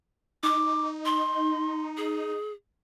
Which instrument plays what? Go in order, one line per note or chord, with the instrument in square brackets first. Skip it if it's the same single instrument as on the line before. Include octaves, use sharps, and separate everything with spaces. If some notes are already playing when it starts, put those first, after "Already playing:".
[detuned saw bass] D#4 [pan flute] D6
[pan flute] C6
G#4